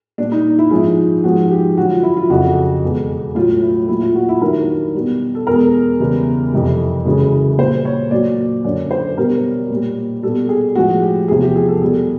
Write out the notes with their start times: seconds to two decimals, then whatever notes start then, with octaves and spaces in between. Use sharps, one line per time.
0.18 A#2 G3 D4
0.32 D#4
0.59 E4
0.71 G#2 F3 G#3 F4
1.24 G#2 F3 G#3 F#4
1.51 G4
1.77 G2 D3 F#3 F#4
1.90 F4
2.03 E4
2.17 F4
2.30 F2 C#3 F#3 F#4
2.83 E2 B2 G#3
3.35 A2 F#3 F4
3.62 E4
3.88 A#2 F#3 E4
4.01 F4
4.15 F#4
4.29 E4
4.41 G2 D#3 F#3 A#4
4.94 B2 G3
5.35 A4
5.47 E2 B2 G#3 A#4
5.99 E2 C#3 E3 G3
6.53 F2 C3 E3 G3
7.05 F#2 C#3 E3 G#3
7.58 A#2 C5
7.62 G3
7.85 C#5
8.11 A#2 F#3 D5
8.64 F#2 D3 F#3 D5
8.91 C5
9.18 B2 G3 A#4
9.71 A#2 G3
10.23 G3 A4
10.27 B2
10.49 G#4
10.75 A2 F3 G#3 F#4
11.02 G4
11.28 E2 C3 F3 G#4
11.43 G4
11.56 G#4
11.68 A4
11.81 B2 G3 G#4